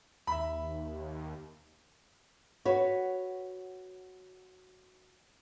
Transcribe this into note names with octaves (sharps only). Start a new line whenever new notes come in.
D#2 E5 B5
F#4 B4 C#5